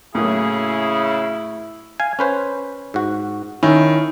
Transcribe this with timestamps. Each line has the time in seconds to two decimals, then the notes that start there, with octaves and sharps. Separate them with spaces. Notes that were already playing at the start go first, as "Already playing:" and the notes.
0.15 A2 C#3 F#3 A#3 E4 G#4
2.00 F5 G#5
2.19 C#4 B4 C5
2.94 G#2 F#4
3.63 D#3 C#4 E4